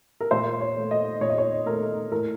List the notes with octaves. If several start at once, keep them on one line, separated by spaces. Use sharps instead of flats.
A#4
A#2 C5
C#5
A3
D#5
A#2 C#5
D#5
C#5
A3 A#4
A2 A#4